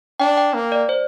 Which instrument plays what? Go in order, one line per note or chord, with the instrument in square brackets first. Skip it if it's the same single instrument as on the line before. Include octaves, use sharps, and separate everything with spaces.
[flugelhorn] D4 [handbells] G5
[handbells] G5
[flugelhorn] A#3
[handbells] D5
C5